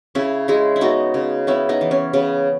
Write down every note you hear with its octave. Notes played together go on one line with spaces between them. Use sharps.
C#3 C#4 E4
G#3 E4 G#4
E4
B3 D#4 F#4
C#3
B3 C#4 E4
B3 D#4
E3
C#4
C#3 B3